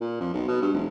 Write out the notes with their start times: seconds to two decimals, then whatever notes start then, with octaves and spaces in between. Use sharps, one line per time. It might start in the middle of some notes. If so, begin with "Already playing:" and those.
0.01 A#2
0.21 F2
0.34 B1
0.48 B2
0.62 G2
0.74 F1